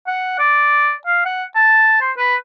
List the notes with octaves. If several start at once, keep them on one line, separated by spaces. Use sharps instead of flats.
F#5
D5
F5
F#5
A5
C5
B4